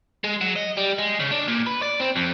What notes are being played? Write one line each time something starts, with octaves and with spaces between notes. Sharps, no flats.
G#3
F#3
D#5
G3
G#3
C#3
D4
A#2
B4
D5
C4
F2